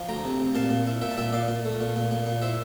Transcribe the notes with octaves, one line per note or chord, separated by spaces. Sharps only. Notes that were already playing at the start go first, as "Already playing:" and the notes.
Already playing: F3
D2 G5 A#5
C3
C3
A#2 F5 A5
A#2
E4
A#2 E5 G5
A5
A#2 E5 G5
A#2 D5 F5
A#2
A3
A#2
A#2
A#2
A#2
E4 C5 E5